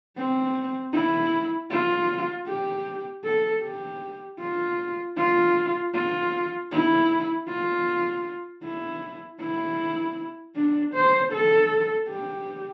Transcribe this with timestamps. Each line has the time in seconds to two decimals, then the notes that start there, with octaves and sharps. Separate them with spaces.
0.17 C4
0.93 E4
1.71 F4
2.47 G4
3.24 A4
3.63 G4
4.40 F4
5.17 F4
5.94 F4
6.72 E4
7.48 F4
8.63 E4
9.41 E4
10.56 D4
10.95 C5
11.33 A4
12.10 G4